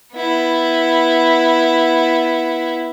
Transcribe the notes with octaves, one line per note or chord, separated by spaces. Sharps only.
B3 E4